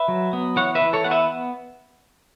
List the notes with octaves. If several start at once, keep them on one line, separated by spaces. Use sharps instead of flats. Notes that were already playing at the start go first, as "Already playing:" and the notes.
Already playing: B4 E5
F#3
B3
E3 C#5 F#5
B4 E5
E3
A4 C#5
B3 F#5
B4 E5